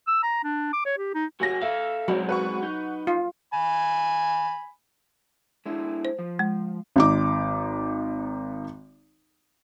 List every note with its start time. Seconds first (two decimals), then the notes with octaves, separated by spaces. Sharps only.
0.07 E6
0.23 A#5
0.44 D4
0.73 D6
0.85 C#5
0.98 G4
1.14 D#4
1.40 F#3 A#3 F#4 G4 G#5 A#6
1.62 A4 E5 F5
2.08 F#3 G#3 C4 F#4
2.29 B4 F#5 C#6
2.63 D#4
3.07 F4
3.54 G#5 B5
5.66 G#3 D4 E4
6.05 C5
6.19 F3
6.39 G#3
6.96 G#1 D#4 D6